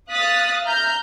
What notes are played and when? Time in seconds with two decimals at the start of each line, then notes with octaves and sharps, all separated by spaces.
0.11 F5 D#6 F#6 A6 B6
0.65 E5 A#5 F6 G6